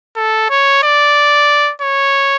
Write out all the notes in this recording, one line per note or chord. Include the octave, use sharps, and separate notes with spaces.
A4
C#5
D5
C#5